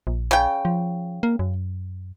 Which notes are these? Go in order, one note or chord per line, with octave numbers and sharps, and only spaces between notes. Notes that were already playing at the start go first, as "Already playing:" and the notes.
A#1
C#3 G5
F3
A#3
F#2